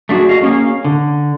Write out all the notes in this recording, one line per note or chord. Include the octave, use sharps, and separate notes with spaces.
A3 D4 F4 F#4 G#4
F#4 D#5 F5
A#3 C#4 D4 G#4 F5
D3